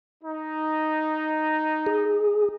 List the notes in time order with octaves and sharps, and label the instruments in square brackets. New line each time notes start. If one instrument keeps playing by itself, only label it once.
[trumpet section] D#4
[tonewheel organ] G#4